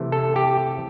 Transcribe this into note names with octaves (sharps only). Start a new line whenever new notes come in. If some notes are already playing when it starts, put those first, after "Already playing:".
Already playing: C3 E3 A3
A4
G4